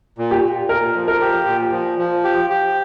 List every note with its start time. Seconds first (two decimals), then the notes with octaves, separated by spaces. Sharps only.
0.18 A#2
0.31 G4
0.44 A#2
0.69 A#2 A#4
0.95 F3
1.08 A#4
1.21 G4
1.47 A#2
1.73 F3
1.98 F3
2.24 G4
2.50 G4